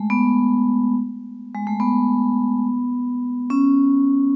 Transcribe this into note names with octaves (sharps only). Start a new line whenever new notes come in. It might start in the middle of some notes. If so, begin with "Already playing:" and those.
Already playing: G#3 A3
B3
G#3
A3
B3
C#4